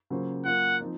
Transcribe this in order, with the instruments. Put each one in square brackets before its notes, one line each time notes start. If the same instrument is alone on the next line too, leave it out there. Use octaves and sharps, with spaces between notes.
[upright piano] C#3 F#3 A#3 F4 C5
[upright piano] F#3 A#3 F4 [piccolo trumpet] F#5
[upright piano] F3 C4 D#4